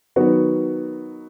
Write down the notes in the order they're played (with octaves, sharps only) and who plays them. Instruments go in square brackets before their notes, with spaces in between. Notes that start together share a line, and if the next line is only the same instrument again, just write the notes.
[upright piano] D#3 F#3 B3 F#4